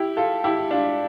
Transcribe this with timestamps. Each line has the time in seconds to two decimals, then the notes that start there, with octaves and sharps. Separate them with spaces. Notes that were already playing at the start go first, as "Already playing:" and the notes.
Already playing: E4 G4
0.17 F4 A4
0.44 E4 G4
0.71 D4 F4